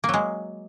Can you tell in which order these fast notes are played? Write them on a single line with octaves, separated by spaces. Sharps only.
A#3 F#3 G#3